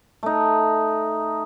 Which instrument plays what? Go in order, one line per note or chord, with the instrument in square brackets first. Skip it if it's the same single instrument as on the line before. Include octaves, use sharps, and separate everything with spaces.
[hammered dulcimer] A3 D#4